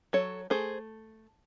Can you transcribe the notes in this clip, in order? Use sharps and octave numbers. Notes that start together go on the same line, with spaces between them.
F#3 A4 C#5
A3 G#4 C5